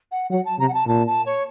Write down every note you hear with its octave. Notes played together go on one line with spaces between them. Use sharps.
F#5
F#3 F#5
A5
C3 A#5
F#5
A5
A#2 A5
A5
C#5